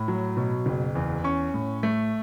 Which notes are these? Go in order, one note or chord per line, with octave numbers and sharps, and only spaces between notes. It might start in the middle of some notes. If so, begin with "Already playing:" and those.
Already playing: A2 B5
F#3
B2
F#1
E2
C#4 C#6
A2
A3